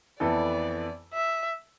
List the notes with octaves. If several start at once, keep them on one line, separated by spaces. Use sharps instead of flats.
F2 E3 B3 E4 A4 D5
E5